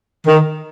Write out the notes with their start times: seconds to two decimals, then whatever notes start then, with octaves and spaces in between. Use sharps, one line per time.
0.27 D#3